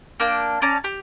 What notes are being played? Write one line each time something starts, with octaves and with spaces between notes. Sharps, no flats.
A#3 D4 G5
C#4 D5 A5 A#5
G4